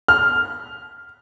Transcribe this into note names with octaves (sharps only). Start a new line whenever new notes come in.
F6